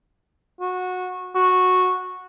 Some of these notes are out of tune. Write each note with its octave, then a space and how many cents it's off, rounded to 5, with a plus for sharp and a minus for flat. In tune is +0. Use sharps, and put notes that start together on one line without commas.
F#4 -20
F#4 -10